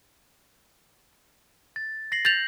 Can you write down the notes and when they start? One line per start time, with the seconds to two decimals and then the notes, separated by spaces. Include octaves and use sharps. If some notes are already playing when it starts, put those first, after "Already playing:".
1.76 A6
2.12 A#6 C7 F#7
2.25 G6 A6 F7 F#7